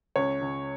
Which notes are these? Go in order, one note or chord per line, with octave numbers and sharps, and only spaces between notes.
C#2 C#5
C#2